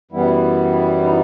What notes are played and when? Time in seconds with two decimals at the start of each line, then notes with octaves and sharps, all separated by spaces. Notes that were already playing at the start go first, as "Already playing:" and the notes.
0.11 F#2 E3 G3 B3 E4
1.01 D#4